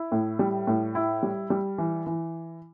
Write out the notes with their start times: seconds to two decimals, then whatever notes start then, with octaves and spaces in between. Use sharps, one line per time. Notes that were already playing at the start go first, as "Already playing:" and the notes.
Already playing: E4
0.12 A2
0.39 G3
0.67 A2
0.95 E4
1.23 G3
1.50 G3
1.78 E3
2.06 E3